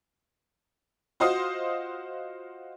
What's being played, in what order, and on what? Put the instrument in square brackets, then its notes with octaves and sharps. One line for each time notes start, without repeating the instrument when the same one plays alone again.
[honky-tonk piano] F4 F#4 C5 D#5 F5 D#6